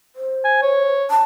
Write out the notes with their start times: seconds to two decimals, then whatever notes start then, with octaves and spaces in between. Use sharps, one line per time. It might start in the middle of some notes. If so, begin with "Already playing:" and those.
0.16 C5
0.45 G#5
0.62 C#5
1.10 A5